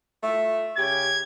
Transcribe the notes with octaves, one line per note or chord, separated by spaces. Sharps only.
A3 F4 E5
C#3 G4 G#6